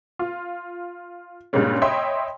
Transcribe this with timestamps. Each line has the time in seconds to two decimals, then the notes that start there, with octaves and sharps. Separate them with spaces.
0.19 F4
1.53 G2 A#2 C#3 G3 G#3 C#4
1.82 C#5 D#5 E5 G5 B5 C6